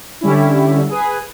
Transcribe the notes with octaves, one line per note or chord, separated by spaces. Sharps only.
D3 G3 C#4 E4
G#4 B4